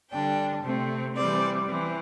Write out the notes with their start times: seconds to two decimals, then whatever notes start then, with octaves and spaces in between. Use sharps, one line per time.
0.10 D3 G3 D4 G5
0.63 C3 A3 C4
1.15 E3 G3 C4 D5
1.67 E3 C4